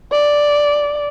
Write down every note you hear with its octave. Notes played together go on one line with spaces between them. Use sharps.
D5